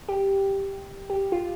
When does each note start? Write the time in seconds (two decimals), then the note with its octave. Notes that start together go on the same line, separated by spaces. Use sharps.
0.09 G4
1.10 G4
1.32 F4